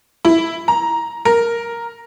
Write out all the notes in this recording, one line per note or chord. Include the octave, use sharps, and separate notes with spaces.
E4
A#5
A#4